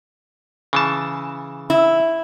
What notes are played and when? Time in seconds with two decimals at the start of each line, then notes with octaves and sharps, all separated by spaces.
0.73 C#3 E3 A5
1.70 E4